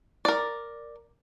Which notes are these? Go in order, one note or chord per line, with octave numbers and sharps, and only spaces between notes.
A#4 D5